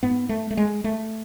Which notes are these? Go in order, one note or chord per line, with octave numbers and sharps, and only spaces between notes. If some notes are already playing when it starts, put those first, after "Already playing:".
G#2 B3
A3
A3
G#3
A3